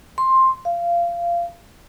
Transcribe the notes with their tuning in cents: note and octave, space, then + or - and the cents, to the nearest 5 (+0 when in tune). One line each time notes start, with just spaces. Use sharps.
C6 +10
F5 -20